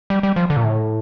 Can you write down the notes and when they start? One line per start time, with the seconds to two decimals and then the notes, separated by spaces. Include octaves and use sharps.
0.10 G3
0.23 G3
0.36 F3
0.50 D3
0.57 A#2
0.64 A2